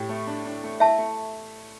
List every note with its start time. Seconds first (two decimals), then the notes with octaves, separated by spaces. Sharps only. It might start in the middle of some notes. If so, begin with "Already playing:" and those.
Already playing: A2 G4
0.09 A3
0.27 D4
0.45 D4
0.64 A3
0.80 E4 E5 A5
0.98 A3